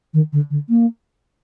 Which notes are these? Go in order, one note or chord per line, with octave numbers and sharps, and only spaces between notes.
D#3
D3
D3
A#3